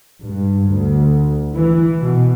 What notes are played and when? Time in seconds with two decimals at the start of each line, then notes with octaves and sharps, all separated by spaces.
0.24 G2
0.72 D2
1.54 E3
2.00 B2